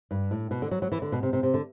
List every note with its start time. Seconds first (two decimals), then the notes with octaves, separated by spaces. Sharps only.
0.11 G2
0.31 A2
0.51 B2
0.62 D3
0.71 F#3
0.82 F#3
0.92 E3
1.02 D3
1.12 B2
1.23 C3
1.33 C3
1.43 C3
1.54 D3